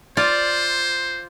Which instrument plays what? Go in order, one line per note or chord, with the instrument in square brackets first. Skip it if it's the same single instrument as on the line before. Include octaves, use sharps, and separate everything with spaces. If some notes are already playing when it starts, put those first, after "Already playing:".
[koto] F4 D5 [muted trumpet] C5